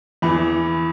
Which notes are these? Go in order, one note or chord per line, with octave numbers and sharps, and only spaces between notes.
E2 E3 B5